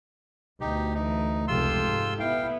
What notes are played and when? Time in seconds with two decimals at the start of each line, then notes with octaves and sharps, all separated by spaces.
0.61 D2 B2 D#4 G4
0.94 E3 A3 D#4
1.48 F1 C#2 F3 F4 G4 A4 C6 E6
1.81 G#2
2.20 B3 E4 F5 G5